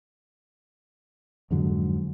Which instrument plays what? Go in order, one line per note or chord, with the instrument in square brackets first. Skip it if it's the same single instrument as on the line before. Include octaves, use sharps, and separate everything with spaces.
[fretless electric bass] F2 G#2 D3 F#3